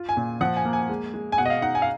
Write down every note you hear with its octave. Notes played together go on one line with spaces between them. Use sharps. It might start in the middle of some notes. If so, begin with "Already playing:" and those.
Already playing: F4
G#5
A#2
F3 F#5
G#5
A#3
G#5
G#3
G#3
G#5
B2 F#5
D#5
F5
D#4 F#5
G#5
F5